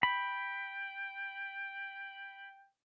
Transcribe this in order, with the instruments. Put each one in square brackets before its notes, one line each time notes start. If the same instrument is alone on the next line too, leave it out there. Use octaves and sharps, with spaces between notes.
[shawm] G5 [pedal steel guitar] B5